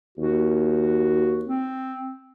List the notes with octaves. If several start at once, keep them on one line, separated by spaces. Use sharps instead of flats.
D#2 F#4
C4